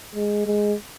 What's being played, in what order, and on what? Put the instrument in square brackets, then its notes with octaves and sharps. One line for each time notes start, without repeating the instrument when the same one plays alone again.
[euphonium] G#3
G#3